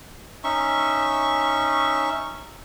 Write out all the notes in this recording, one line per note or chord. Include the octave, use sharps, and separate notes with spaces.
C#4 D#4 E5 C#6